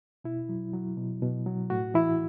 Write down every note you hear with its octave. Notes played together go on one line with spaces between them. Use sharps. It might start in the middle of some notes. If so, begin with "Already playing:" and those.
B2 E4
F#3
F#3
B2
B2
F#3
A2 F#4
E3 E4